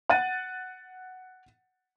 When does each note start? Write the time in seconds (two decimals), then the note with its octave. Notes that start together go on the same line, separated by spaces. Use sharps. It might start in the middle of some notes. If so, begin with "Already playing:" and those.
0.10 F#5 F#6 A6 D#7